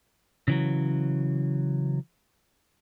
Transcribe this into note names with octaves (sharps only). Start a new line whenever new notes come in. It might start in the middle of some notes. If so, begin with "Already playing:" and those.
C#3 E3 F#3